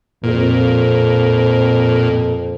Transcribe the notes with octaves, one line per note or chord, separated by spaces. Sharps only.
F2 A#2